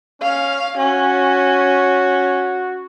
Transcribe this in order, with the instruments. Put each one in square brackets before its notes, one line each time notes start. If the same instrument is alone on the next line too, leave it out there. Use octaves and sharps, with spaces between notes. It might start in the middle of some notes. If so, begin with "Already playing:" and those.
[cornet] C#4 [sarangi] F5
[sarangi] C#4 [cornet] F#4